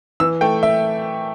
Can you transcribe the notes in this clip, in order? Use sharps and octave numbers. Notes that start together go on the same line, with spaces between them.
E3 E6
A3 G5
E5